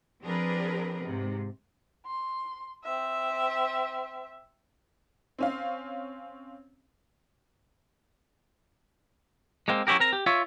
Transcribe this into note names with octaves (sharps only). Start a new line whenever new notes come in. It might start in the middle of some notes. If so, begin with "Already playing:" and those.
F3 C4 D4 G#4 A#4 B4
G#2 C3
C6
C4 E5
C4 C#4 F5
G#3 A#3 C4
F#3 C#4 E4 G4 A#4
C4 A#4 A#5
G4
F4 C#5 E5